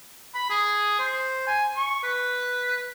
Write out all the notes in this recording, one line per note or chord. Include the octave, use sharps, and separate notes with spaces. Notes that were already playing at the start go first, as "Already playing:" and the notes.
B5
G#4
C5
G#5
C#6
B4